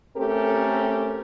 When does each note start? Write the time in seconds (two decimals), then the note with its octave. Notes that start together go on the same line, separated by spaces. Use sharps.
0.16 A3 C4 C#4 G4 A4 A#4